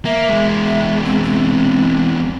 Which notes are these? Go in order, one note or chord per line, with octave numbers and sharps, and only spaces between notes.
A#3 E5
E2 G#3
E5
C4
C4